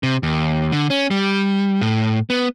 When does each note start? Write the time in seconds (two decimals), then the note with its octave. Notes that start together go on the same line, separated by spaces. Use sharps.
0.03 C3
0.23 D#2
0.72 D3
0.90 C#4
1.11 G3
1.82 A2
2.30 B3